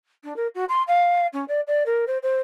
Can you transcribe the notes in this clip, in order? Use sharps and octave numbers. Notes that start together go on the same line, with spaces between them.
D4
A#4
F#4
C6
F5
C#4
D5
D5
A#4
C5
C5